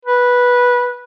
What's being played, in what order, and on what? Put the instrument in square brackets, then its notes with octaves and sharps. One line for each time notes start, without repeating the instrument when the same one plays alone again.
[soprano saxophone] B4